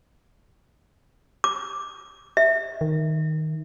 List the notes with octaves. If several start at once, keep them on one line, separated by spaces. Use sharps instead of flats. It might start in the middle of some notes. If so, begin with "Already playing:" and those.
D6
E5
D#3